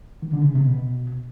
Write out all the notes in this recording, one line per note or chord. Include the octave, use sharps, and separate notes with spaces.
D#3
D3
C#3
C3
B2